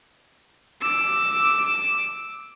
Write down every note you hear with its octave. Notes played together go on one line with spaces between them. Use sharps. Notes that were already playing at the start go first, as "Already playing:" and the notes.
D6 E6